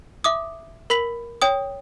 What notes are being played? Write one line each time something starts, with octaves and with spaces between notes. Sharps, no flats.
E5 D6 D#6
A#4 B5 B6 F#7
C#5 G5 D#6